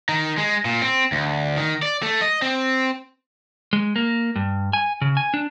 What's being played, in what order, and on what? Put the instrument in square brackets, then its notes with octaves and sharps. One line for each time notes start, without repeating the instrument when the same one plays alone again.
[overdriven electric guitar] D#3
G#3
A#2
C4
D2
D#3
D5
A3
D#5
C4
[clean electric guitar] G#3
A#3
G2
G#5
C#3
G#5
D4